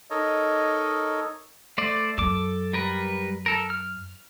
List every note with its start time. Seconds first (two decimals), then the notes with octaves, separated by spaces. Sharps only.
0.10 D#4 A4 A#4 C#5 D#5
1.78 A3 C5 D5
2.18 F#2 A4 D6
2.73 G3 A#4 B4
3.46 A4 A#4
3.70 F6